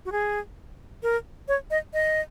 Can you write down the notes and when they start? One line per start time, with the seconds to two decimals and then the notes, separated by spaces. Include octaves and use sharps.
0.05 F#4
0.12 G#4
1.03 A#4
1.48 C#5
1.70 D#5
1.93 D#5